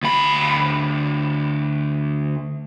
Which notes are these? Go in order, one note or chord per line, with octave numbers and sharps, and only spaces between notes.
D2 B5